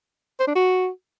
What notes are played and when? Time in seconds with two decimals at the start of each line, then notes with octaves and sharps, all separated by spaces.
0.39 C5
0.47 D4
0.55 F#4